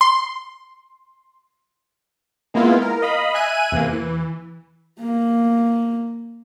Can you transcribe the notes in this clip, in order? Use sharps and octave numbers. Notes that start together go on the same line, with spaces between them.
C6
G#3 A#3 B3 E4 F4
A#4
D#5 F5 B5
E5 G#5 F#6 D#7
E2 C3 E3 A#3
E3
A#3